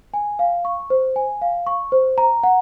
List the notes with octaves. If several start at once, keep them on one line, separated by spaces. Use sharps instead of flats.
G#5
F5
C#6
C5
G#5
F5
C#6
C5
A#5
F#5